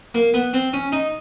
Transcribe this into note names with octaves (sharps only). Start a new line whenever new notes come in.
A#3
B3
C4
C#4
D#4